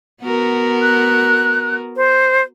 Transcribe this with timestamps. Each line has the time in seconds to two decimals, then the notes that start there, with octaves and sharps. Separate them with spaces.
0.22 B3 F#4 A#4
0.82 F#6
1.96 C5